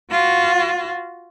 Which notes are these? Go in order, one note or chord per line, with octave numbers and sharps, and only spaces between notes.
F4 F#4